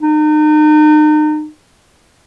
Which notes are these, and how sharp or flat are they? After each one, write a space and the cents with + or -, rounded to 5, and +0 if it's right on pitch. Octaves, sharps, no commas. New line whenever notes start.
D#4 -35